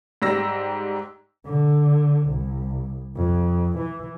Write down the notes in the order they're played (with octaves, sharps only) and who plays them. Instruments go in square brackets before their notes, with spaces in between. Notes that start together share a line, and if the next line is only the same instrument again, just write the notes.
[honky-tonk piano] G#2 G3 E6 A#6
[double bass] D3
C2
F2
E3